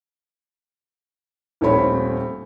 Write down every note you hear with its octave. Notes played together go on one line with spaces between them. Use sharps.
D#1 A#1 A3 C4 C#5 B5